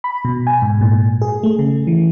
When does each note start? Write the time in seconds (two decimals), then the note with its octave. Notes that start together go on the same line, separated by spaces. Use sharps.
0.04 B5
0.25 B2
0.47 G#5
0.62 G#2
0.81 A#2
1.22 G#4
1.43 A3
1.59 C#3
1.87 E3